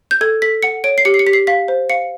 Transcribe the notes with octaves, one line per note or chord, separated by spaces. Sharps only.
G6
A4 G#6
A4 B6
F#5 C#7
C#5 D7
C7
G4 C#7
C7
C#7
G4 B6
C7
F5 B6
C5
F5 C#7